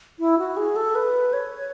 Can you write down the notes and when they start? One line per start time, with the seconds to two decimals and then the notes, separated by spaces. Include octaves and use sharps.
0.19 E4
0.38 F#4
0.57 G#4
0.76 A4
0.95 B4
1.33 C#5